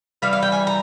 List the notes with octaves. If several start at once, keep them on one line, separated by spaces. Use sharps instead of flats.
E3 G3 F5
F5
G5
G#5
A#5